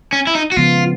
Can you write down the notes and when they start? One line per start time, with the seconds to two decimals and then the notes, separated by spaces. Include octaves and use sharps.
0.13 C#4
0.27 E4
0.35 D#4
0.52 F#4
0.56 C#3 F3 G#3 B3 F4